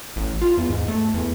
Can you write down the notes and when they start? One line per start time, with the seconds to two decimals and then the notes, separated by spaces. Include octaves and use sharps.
0.16 A1
0.42 F4
0.57 E2
0.70 G#2
0.88 A3
1.14 E2